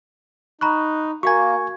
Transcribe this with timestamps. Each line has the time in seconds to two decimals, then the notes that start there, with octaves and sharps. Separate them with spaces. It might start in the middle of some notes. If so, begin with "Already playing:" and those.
0.61 D#4 A#5 B5 C#6 F#6
1.23 A#3 F#4 F5 G#5 C#6 G#6